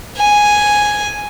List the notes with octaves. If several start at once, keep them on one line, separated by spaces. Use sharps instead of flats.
G#5